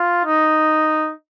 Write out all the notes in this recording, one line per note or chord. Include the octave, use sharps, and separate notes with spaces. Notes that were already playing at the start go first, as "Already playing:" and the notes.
Already playing: F4
D#4